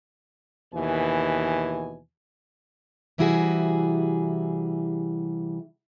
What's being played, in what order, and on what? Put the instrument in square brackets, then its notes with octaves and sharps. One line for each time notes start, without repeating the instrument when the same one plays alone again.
[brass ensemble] D#2 B2 E3 G#5
[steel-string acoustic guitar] C3 E3 G3 E4 F#4 G#4